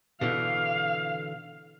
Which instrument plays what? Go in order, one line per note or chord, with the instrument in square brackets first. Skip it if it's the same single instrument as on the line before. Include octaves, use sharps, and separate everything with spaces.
[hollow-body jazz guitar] B2 D3 E3 [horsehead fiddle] F5